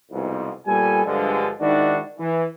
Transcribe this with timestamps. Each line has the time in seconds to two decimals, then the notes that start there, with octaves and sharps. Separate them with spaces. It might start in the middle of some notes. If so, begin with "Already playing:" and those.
0.11 C2 F2 G#2 B2
0.67 A#2 G3 B3 A4 G#5
1.06 G2 D3 F3 G#3
1.61 G#2 D#3 D4 E4 F#4 D5
2.19 E3